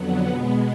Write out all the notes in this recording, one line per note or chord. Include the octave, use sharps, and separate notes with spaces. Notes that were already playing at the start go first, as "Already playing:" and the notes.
Already playing: F2 D3 F#3 B3 F#4
B2 G#3 B3